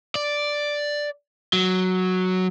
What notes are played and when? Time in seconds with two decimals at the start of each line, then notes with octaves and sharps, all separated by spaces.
0.15 D5
1.53 F#3